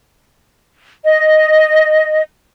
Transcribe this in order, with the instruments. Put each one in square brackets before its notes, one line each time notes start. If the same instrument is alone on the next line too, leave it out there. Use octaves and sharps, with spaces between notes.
[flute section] D#5